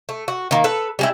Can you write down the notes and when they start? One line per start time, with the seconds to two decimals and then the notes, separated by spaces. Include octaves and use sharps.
0.09 A3
0.28 F#4
0.51 D#3 A#3
0.64 A4 B4
0.99 G3 G#3 E4